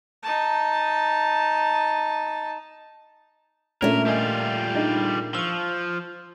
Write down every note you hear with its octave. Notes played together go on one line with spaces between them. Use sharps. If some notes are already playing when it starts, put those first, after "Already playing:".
D#4 A5
A#2 A3 C#4 D4 A#4
G3 F4 A4 D#5 G#5
D4 D#4 G#4
F3 C#6 E6